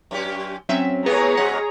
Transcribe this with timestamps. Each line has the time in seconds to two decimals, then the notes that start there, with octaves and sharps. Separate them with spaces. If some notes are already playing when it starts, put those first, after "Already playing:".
0.11 F#2 C#4 G4
0.69 F#3 C4 C#4 E5
1.06 A2 C3 B3 C4 G#4 C#5 A#5
1.37 B2 G#3 C#4 F#5